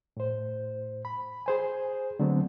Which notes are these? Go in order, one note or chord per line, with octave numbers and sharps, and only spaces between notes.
A2 C5
B5
G#4 C5 G#5
D3 F#3 A3 B3 C4